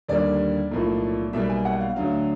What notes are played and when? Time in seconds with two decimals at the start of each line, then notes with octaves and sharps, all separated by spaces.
0.09 D#2 D3 G3 A#3 D5
0.71 B1 A2 F3 A#3
1.33 B1 B2 G3 A#3 E5
1.49 G#5
1.65 F#5
1.80 F5
1.96 D2 D3 F#3 F5